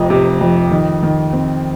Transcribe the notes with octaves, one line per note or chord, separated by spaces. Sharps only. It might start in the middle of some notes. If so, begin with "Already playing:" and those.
Already playing: F1 F2 C3 D#5
C3
F2
D#3
D#3
C4